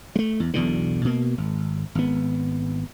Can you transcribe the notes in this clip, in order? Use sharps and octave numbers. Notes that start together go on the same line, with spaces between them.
G#3 A3
E2
B1 E2 B2 D3
B2 A#3
G#1
G#1 B3